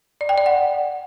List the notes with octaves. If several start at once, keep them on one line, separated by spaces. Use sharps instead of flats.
D5
G5
D5
F#5